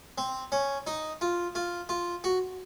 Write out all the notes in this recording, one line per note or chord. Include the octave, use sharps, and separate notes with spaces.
C4
C#4
D#4
F4
F4
F4
F#4